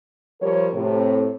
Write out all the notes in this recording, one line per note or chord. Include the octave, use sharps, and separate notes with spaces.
F3 G3 A#4 C#5
A2 C3